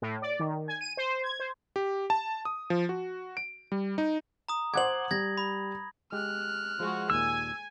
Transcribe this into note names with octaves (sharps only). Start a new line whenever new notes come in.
A2
D5
D#3
G#5
D#7
C5
G#6
C5
G4
A5
D#6
F3
F#4
D7
G3
D#4
A#5 D#6
C5 F#5 D6 G#6 F#7
G3 G#6 A#6
B5
G#3 G4 F6 F#6
F3 G#3 F#4
D#2 A#2 G#5 E6